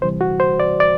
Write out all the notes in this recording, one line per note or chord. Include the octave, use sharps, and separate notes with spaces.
D2 C3 E3 G3 C5
F#4
C5
D5
D5